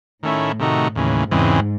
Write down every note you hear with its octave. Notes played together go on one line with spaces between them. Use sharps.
A2 D#3 A3 C#4 E4
C3 D#3 A3 D#4 F#4
D#2 A2 C#3 E3
E2 G#2 C#3 E3 G#3 C4